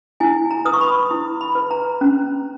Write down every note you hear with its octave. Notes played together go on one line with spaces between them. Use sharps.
E4 G#5
A#5
B4 D#6
C#6
B5
E4
B5
B4
A#5
C#4